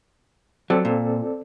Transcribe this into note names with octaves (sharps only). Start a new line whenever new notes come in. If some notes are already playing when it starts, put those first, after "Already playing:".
F#3 C4 A4 D5
A#2